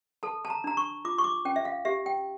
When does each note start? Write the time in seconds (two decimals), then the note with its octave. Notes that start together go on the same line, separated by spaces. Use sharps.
0.23 A4 A5
0.45 A5
0.50 A#5
0.64 D4 A#5
0.77 C#6
1.05 F4 D6
1.18 C#6
1.24 D6
1.45 C#4 G5
1.56 E5
1.65 F5
1.85 G4 E5
2.06 G5